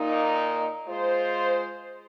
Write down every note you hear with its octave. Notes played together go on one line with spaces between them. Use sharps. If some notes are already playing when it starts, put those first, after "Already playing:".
Already playing: A#2 A#3 D#4
G#3 F4 C5